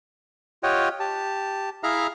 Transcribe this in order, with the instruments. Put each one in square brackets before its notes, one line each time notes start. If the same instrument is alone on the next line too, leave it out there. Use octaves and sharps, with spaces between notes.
[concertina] F4 G4 C#5 D#5 F#5 G5
G4 A5
E4 G#4 E5 F5 A#5 F6